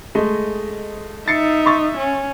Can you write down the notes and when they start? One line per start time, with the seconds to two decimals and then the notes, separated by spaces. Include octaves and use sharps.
0.15 G#3 A3 D#5
1.28 D#4 E5 A6 C7 C#7
1.66 C6 C#6 A6
1.97 C#4